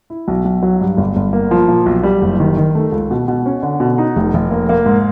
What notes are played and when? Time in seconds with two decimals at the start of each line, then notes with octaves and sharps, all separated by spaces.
0.10 E4
0.28 B1
0.45 B1
0.62 F#3
0.81 G2
0.98 G1
1.16 G1
1.33 A#3
1.51 F3
1.68 A#2
1.86 B1
2.03 G3
2.22 F#1
2.40 D#3
2.57 D#3
2.75 A3
2.92 C#2
3.11 B2
3.28 B2
3.46 C#4
3.63 D3
3.80 B2
3.98 D#4
4.16 F1
4.34 F1
4.51 A#3
4.69 A#3
4.86 G#2